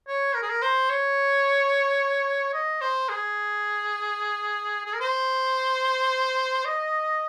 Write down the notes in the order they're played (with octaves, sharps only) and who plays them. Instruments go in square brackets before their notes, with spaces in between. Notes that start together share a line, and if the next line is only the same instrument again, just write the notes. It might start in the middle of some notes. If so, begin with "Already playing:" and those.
[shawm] C#5
A#4
G#4
A#4
C5
C#5
D#5
C5
G#4
G#4
A#4
C5
D#5